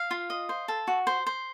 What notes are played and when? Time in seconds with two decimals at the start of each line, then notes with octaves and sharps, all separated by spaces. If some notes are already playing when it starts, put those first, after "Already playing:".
Already playing: F5
0.11 F4
0.30 D#5
0.49 C5
0.68 A4
0.88 F#4
1.07 C5
1.27 C5